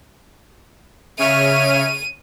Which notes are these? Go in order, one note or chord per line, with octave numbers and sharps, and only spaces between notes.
C#3 C#5 E5 F6 D#7